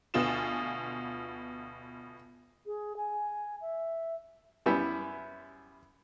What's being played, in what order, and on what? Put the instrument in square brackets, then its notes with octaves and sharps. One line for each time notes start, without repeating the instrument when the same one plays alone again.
[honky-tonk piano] D2 B2 B3 F4 E7
[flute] G#4
G#5
E5
[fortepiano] F#2 G3 B3 E4 E5